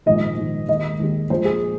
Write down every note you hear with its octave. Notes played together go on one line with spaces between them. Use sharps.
A#1 G#2 D#3 D#5
A#1 G#2 D#3
D#2 D#3 G#3 D#5
D#2 D#3 G#3
A#1 A#2 G#3 C5
G#4